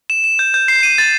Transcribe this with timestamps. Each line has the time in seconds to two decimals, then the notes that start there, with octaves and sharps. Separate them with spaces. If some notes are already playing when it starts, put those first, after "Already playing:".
0.10 E7
0.24 E7
0.39 G6
0.54 G6
0.68 C7
0.83 D#7
0.98 A6